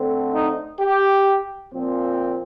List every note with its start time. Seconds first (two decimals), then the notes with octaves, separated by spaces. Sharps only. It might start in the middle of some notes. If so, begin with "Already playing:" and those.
Already playing: D3 A3 C4
0.34 D#4
0.81 G4
1.73 A#2 F3 C4